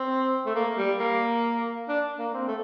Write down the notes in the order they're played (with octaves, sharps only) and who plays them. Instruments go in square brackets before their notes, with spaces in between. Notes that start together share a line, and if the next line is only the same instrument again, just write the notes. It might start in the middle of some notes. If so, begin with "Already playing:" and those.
Already playing: [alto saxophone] C4
A3
A#3
G3
A#3
D4
A#3
C4
A3